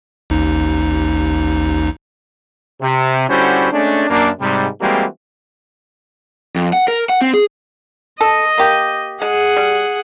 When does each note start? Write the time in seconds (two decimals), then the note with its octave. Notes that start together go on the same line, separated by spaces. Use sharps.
0.30 A1 D#2 D#4
2.81 C3
3.29 D3 G3 C#4 E4 F#4 C5
3.72 G#3 A3 C#4 D4
4.10 F#2 A#3 D4
4.40 G#2 C3 G3
4.81 E3 G3 G#3 A#3 C4 F#4
6.56 F2
6.73 F#5
6.88 A#4
7.09 F#5
7.22 C4
7.34 G#4
8.21 A4 D#5
8.58 A#3 G4
9.22 G#3 G#4 F#5
9.57 G3